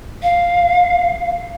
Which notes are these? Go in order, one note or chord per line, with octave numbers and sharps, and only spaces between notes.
F5